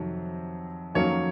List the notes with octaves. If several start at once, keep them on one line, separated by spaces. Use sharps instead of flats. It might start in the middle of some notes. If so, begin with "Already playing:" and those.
Already playing: F2 C3 D#3 F#3
F2 D#3 F#3 A#3 C#4 C#5